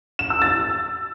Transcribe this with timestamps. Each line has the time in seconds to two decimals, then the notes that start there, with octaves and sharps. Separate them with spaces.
0.19 E7
0.30 E6
0.42 A6